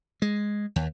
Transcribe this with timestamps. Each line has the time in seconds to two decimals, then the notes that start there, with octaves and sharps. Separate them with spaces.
0.22 G#3
0.76 D#2